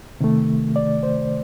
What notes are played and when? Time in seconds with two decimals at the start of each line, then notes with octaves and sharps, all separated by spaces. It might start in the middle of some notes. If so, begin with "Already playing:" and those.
0.20 C3 D#3 A3
0.76 D5
1.03 C5